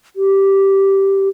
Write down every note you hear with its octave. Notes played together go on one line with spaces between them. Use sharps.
G4